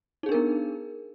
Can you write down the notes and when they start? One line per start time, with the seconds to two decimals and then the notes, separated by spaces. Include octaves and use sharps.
0.23 D#4
0.26 G#4
0.29 D4
0.32 A#4
0.34 B3